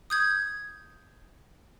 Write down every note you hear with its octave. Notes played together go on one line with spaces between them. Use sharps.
D#6 G6 G#6